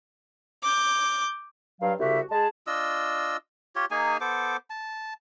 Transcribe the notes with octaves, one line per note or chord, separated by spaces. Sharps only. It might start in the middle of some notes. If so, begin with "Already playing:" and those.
D6 G6
G2 F#3 F5
C2 C#3 F#4 G4 E5
G#3 G#4 A5
D4 F4 D#5 E6
F4 G4 C#5
A#3 D#4 G#4 G#5
B3 A4 C5 D6
A5